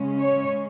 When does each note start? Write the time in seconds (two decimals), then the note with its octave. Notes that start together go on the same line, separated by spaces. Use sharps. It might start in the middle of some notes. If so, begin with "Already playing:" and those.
Already playing: C#3 G#3 C#4
0.20 C#5